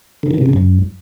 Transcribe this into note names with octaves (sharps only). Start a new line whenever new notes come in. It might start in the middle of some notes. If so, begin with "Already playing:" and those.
D3
D#3
C3
C#3
F#2